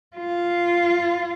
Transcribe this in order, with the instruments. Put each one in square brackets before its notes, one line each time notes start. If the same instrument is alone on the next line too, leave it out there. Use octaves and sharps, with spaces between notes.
[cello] F4